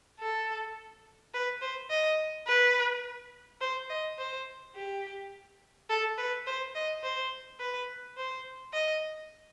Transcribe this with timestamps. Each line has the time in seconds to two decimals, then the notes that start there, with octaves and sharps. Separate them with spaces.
0.20 A4
1.34 B4
1.62 C5
1.90 D#5
2.47 B4
3.61 C5
3.89 D#5
4.18 C5
4.75 G4
5.90 A4
6.18 B4
6.47 C5
6.75 D#5
7.03 C5
7.60 B4
8.17 C5
8.73 D#5